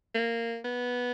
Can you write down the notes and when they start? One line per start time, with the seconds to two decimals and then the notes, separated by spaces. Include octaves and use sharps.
0.15 A#3
0.65 B3